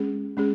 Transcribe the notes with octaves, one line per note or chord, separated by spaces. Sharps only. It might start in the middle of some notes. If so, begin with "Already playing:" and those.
Already playing: G#3 C#4 G#4
G#3 C#4 G#4